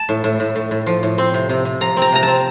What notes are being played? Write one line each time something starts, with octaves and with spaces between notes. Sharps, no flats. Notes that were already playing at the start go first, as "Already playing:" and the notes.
Already playing: A5
A2
A2
A2
A2
A2
F3
A2
C4
C3
C3
C3
F3 A#5
C4
A#5
C3 A#5
C4 A5